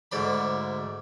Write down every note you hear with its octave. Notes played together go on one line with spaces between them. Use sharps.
D2 G#2 D5 B5